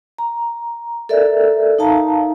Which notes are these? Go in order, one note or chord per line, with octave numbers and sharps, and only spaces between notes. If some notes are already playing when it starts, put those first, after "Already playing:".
A#5
A4 A#4 D5 E5
D#4 F5 A5 A#5